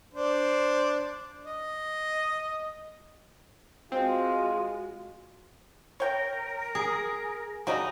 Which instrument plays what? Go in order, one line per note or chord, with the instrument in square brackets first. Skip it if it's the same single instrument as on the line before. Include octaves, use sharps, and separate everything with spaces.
[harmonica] D4 C5
D#5
[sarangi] G#3 [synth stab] C4 [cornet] F4 [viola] F#4
[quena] A#4 [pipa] C#5 G5
[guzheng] G#4
[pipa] C#3 G3 D#4 [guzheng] F#4 [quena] A#5